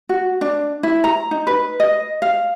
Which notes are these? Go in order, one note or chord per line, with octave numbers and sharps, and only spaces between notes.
F#4
D4
E4
A#5
D#4
B4
D#5
F5